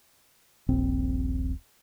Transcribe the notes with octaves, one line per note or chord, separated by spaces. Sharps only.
D#1 A#1 C4